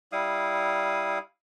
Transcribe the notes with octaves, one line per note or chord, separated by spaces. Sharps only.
G3 E4 F5 D#6